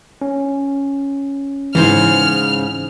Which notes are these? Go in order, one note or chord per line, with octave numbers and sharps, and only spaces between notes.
C#4
G#2 C#3 E3 C5 F6